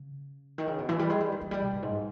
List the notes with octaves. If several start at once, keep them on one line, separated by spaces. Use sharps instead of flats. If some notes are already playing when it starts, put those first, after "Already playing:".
Already playing: C#3
D#3
C#3
B2
E3
G3
G#3
G3
D#3
E3
G3
B2
G2
G#2
G3